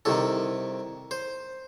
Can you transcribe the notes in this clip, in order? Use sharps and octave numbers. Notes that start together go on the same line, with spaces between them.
C2 C3 D#3 A4
C5